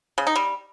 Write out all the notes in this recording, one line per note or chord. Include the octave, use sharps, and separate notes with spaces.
C#3
D#4
G3